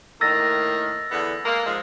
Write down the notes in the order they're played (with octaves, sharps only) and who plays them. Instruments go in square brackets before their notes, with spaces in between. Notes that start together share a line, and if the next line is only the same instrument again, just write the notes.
[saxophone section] A2 D#3 A#3 [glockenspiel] E6 A6 A#6
[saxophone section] E2 D3 B3
G#3 A#3
G#2 F3 G#3